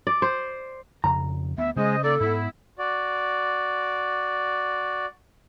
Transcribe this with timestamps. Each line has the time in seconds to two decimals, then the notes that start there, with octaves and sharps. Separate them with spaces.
0.07 D5
0.22 C5
1.04 F2 C#3 A#5
1.58 D2 B3 E5
1.76 C#3 G#3 C#4 C5 D#5
2.03 A#3 D#4 A4 D5
2.20 G#2 B3 E4
2.78 F#4 D5